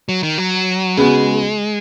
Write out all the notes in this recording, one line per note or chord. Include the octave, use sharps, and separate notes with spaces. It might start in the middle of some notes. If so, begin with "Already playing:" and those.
F#3
D#3
F#3
C#3 G#3 B3 F#4